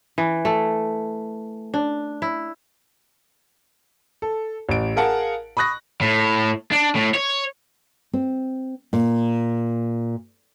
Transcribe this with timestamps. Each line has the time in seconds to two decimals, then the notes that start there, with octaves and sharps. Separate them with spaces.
0.18 E3
0.45 A3
1.74 D4
2.22 E4
4.22 A4
4.69 A1 D7
4.96 G#4 A#4 F5 F#5 A5
5.57 B5 C#6 D#6 F#6 A#6
6.01 A2
6.72 D4
6.96 A2
7.15 C#5
8.13 C4
8.93 A#2